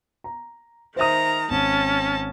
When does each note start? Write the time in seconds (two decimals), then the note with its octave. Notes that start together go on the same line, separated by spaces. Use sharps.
0.24 A#5
0.96 D#3 C5 E5 A#5 D#6
1.50 G#1 C#4 A5